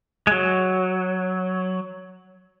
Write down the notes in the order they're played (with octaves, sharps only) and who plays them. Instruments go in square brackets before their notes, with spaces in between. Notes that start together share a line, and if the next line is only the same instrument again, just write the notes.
[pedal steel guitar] G#3
F#3